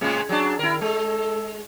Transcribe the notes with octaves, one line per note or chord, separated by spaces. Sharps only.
A2 C#3 G#3
F#3 D4 G#4
D#3 E4 A#4
G#3 A4